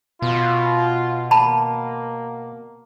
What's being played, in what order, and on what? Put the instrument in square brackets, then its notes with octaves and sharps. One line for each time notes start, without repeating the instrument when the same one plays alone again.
[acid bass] B2 [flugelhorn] F4
[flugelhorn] A#3 [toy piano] A5 B5